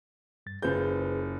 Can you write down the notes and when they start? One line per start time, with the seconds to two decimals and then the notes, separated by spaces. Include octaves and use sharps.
0.46 G2 A6
0.62 F#1 F4 G#4 B4 C5 G6